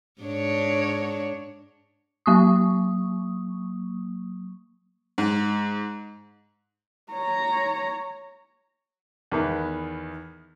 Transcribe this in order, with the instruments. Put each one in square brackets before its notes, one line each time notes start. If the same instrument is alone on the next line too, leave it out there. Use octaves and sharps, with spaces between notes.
[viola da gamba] G#2 D4 C#5
[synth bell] F#3 A#3 C#6 D#6
[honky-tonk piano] G#2
[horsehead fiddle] C#5 A#5
[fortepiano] E2 D#3 B3